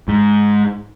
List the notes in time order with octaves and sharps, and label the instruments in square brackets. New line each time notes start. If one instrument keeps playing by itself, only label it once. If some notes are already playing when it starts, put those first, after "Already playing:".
[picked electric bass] G#2